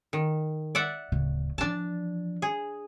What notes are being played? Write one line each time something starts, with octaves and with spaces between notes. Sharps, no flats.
D#3
D5 E5 F#5
D1 C#3
E3 F3 D4 A5
G#4